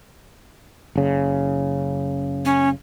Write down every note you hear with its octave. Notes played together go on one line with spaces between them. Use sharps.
F#1 C#3
C#4